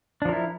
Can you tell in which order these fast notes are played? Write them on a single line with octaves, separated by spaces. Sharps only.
D4 F3 A#4 E4